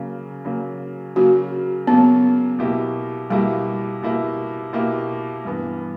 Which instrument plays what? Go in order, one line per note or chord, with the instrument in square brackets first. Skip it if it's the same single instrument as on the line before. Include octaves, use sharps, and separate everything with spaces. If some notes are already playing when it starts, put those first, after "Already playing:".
Already playing: [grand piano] C#3 F#3 A#3
C#3 F#3 A#3
[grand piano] C#3 F#3 A#3 [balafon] F#4
[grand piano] C#3 F#3 A#3 [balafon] B3
[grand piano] B2 A#3 E4 G4
[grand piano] B2 A#3 E4 G4 [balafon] G3
[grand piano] B2 A#3 E4 G4
B2 A#3 E4 G4
G2 E3 B3